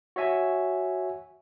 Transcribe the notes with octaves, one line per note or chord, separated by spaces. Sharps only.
F#4 C#5 E5 G#5